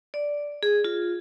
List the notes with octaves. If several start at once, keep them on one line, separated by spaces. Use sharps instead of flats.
D5
G#4
F4